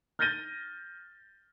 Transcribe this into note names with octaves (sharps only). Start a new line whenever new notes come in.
F6 G6 A6 A#6 D#7 G7